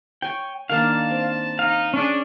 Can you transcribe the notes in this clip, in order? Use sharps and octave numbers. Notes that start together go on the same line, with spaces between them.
C#5 G5 G#5
D#3 A#3 D4 F5 A5
C4
D#4 F5
C#4 D4 G#4 D5